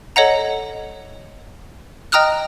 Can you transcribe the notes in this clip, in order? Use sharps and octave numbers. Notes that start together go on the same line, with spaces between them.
A4 C#5 D#5 F#5 A#5
D#5 G5 A#5 D#6 F6 F#6